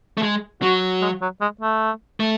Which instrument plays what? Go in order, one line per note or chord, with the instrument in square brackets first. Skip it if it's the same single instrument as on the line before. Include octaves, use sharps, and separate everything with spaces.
[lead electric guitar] A3
G#3
[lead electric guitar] F#3 [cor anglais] F#4
[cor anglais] G#3
F#3
G#3
A3
[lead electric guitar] A3